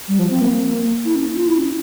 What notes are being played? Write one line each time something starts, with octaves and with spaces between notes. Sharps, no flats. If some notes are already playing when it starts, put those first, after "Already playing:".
G3
F3
C4
A#3
E4
C#4
F4
E4
C#4